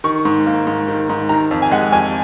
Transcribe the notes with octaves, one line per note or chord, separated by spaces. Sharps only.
D#3 C#6
G#2
A#3
G#2
D#3
G#2
D#3 A#5
F2
G#5
G#3 F#5
F2 G#5